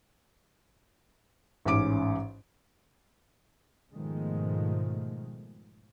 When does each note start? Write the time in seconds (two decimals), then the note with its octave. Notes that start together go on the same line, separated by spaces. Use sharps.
1.65 A1 G#2 C#4 D6 D7
3.94 G#2 B2 D#3 F3 G#3 A3